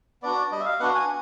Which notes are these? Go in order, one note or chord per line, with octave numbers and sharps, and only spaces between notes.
B3 D4 F#4 D5
G3 D#5
E5
F5
B3 D4 F#4 F#5
G#5